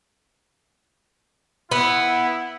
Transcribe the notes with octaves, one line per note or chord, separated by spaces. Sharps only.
B3 E4